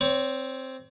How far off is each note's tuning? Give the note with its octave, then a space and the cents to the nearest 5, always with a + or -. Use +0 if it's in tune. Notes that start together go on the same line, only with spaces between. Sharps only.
C4 +0 C#5 +30